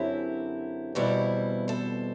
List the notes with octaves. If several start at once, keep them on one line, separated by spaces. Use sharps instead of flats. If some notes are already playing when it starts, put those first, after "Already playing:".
Already playing: F#2 D3 F#3 C4 E4 G4
E2 B2 G3 C4 E4
A4 C5